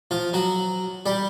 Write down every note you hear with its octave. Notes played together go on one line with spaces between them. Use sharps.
F3 F4
F#3 F#4
G3 G4